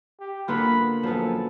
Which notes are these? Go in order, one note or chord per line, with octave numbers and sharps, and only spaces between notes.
G4
D3 A#3 B3 F4 B4 B5
F#2 F3 B3 A4 B4